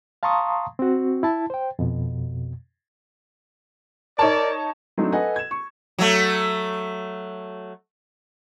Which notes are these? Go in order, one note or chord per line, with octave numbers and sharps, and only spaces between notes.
F5 A5 A#5 C6 C#6 D#6
C4 F#4
E4 A5
C5 G5
F2 B2
D#4 A#4 C#5 D5 A5
F#3 A3 C4 D4 D#4
A4 B4 D#5 F#5 G#5
G#6 E7
C#6
F#3 A3